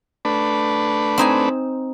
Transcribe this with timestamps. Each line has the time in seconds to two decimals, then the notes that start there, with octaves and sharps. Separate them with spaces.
0.25 A3 D4 B4
1.18 C4 D#4 G#5